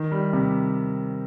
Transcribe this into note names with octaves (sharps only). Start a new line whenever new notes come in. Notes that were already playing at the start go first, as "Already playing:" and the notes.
Already playing: D#3
G3
C3